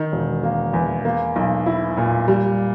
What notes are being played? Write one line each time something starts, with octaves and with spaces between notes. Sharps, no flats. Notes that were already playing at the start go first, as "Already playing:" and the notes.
Already playing: D#3
E1
A#3
E2
A#3
B1
E4
A#2
G3